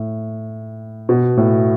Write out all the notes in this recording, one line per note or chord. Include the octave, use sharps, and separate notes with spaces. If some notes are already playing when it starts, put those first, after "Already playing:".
Already playing: A2
B2
A2